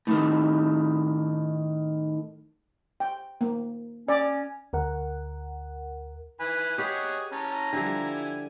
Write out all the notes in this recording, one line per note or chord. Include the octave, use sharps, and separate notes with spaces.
A2 D#3
G5
A#3
C#4 D5
D2 A#4 F#5
E3 B4 G#5 B5
G4 G#4 B4 C#5 D#5 F#5
C#4 A5 A#5
D3 F3 G3 E4 G#5